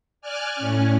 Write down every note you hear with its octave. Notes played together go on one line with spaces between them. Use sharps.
D5 G#5 F6 F#6
A2 C#4